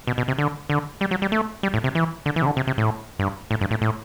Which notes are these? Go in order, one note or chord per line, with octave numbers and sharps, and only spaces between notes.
B2
B2
C3
D3
D3
G3
F#3
G3
A3
G3
A2
C3
E3
D3
E3
C3
D3
C3
C3
A2
G2
A2
G2
A2
A2